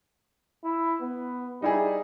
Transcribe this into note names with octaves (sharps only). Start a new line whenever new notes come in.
E4
B3
G3 D#4 E4 G#4